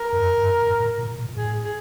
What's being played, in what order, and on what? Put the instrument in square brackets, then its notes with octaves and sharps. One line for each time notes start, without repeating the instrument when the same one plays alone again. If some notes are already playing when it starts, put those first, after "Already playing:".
Already playing: [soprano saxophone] A#4
[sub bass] F#2
G2
G#2
A2
A#2
A#2
[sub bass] A2 [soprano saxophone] G#4
[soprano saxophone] G#4